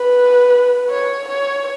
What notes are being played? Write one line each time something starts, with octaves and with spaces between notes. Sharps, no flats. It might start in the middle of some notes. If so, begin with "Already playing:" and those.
Already playing: B4
C#5
C#5